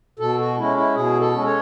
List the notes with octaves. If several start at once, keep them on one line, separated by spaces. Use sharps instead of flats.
B2 A4
F#4
G#3 C#4 E4
E4
B2 G#4
A4
G#3 C#4
C#5